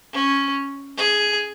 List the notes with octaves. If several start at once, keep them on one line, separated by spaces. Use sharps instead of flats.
C#4
G#4